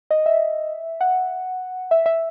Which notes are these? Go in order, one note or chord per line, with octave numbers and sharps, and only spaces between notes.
D#5
E5
F#5
E5
E5